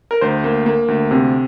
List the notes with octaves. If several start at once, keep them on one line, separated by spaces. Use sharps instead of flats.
A#4
D2 C5
A#3
A#3
D2
C3